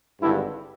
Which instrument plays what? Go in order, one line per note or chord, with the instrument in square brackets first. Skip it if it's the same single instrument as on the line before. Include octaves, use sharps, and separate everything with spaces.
[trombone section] G#1 G2 D3 E4